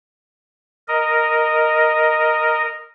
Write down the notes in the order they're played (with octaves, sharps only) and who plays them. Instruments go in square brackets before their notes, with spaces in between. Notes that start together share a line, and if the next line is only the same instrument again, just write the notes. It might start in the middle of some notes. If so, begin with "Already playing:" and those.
[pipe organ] A#4 D#5